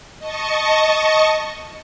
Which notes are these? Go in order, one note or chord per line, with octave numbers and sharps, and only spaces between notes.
D#5 A5 C#6